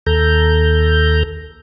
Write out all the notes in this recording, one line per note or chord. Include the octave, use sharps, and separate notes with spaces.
D#2 A4 A#5 G6